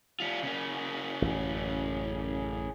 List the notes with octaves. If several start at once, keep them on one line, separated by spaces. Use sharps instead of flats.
G3 F4
C#3 A#3
A1 F#2